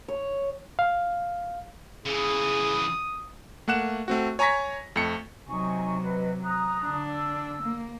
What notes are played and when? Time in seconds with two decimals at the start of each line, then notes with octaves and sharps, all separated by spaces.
0.08 C#5
0.79 F5
2.06 C#3 E3 G#4 D#6
3.68 A3 A#3 F#5 F#6 E7
4.08 A3 C4 F#4
4.39 C#5 G#5 A#5 C#6 A#6 B6
4.96 F2 A3 C#7
5.47 C3 F#3 D#4 G#5 C#6
6.03 B4 D#5
6.44 A#5 D#6 F#6
6.82 D3 D4
7.10 E6
7.63 A#3